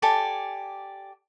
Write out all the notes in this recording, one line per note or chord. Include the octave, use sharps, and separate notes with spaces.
G4 A4 D5 G#5